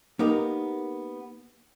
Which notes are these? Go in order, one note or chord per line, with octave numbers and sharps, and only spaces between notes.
A#3 B3 D#4 G4 A#4